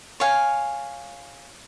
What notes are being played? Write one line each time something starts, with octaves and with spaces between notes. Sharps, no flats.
C#5 F5 G#5